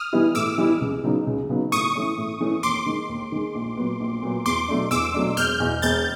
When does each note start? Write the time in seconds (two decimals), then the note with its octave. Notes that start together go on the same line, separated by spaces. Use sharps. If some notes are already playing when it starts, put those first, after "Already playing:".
Already playing: D#6 F6
0.13 E3 G3 B3 E4
0.35 A2 D6 E6
0.58 E3 G3 B3 E4
0.81 C#2
1.04 C#3 F#3 B3 D#4
1.27 C#2
1.49 C#3 F#3 B3 D#4
1.72 A2 C#6 D#6
1.95 E3 A3 C#4
2.18 A2
2.40 E3 A3 C#4
2.63 D#2 C6 D6
2.86 D#3 G#3
3.09 D#2
3.32 D#3 G#3
3.55 A#1
3.77 A#2 F#3 B3
4.00 A#1
4.23 A#2 F#3 B3
4.46 E2 C6 D6
4.68 B2 F#3 A3 D4
4.91 E2 D6 E6
5.14 B2 F#3 A3 D4
5.37 E1 F6 G6
5.60 E2 B2
5.82 E1 G6 A6